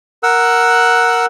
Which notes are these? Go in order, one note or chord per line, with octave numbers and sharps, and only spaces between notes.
A#4 F#5 E6 F#6